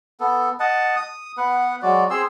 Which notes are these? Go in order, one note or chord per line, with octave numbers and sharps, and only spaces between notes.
B3 A4
D#5 F#5 A5
D#6
B3 B4 F#5
F#3 G#3 F#4 D5
C4 G#4 C6 E6